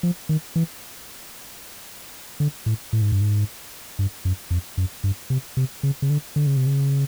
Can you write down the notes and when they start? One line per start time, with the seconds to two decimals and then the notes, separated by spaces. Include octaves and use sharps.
0.03 F3
0.29 D#3
0.56 E3
2.40 D3
2.66 A2
2.93 A2
3.02 G#2
3.12 G2
3.21 G#2
3.99 G2
4.25 F#2
4.51 F2
4.77 F#2
5.04 G2
5.30 C3
5.57 C3
5.83 C#3
6.02 C#3
6.10 D3
6.36 D3
6.47 C#3
6.57 C3
6.67 C#3